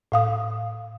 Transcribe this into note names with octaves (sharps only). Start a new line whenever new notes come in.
A2 F5 D#6